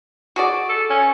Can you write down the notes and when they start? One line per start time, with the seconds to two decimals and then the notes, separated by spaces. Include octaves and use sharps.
0.36 F#4 G#4 D5
0.69 A4
0.90 C#4